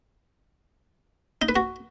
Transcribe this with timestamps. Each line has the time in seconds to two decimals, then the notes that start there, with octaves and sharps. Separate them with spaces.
1.42 D#4
1.49 B4
1.56 F#4